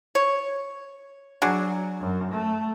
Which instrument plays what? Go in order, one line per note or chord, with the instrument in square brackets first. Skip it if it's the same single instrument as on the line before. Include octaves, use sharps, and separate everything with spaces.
[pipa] C#5
[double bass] F#3 [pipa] D4 F#4 G#4
[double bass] F#2
A3